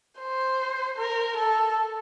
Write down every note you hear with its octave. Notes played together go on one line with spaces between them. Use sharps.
C5
A#4
A4